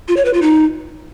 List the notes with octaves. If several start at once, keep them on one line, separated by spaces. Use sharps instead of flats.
F4
C#5
B4
F4
D#4